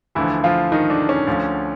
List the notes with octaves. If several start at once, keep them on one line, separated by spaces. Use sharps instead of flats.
D2 D3 E3 F3 E4
F3 F4
D#3 D#4
D3 D4
C#4
D2 D3 F3